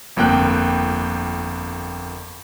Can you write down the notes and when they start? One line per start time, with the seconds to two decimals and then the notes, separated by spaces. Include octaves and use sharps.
0.16 G1 F2 A#3 G5 F#6